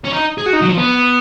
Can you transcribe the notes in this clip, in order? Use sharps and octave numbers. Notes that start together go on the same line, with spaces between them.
C#4
D#4
G#4
F#4
D#4
F#3
F3
B3